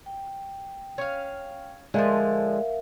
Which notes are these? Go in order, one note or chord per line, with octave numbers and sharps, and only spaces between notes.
G5
C#4 F5
D3 D#3 F3 G#3 A#4 E5 F5